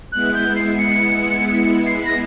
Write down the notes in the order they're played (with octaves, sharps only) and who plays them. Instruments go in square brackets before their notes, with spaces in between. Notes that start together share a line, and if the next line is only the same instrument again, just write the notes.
[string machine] G#3 B3 E4 [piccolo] F#6
[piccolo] G6
C7
C#7
C7
A#6